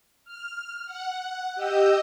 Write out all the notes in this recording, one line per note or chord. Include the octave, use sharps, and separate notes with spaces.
F6
F#5
G4 D#5 E6 G6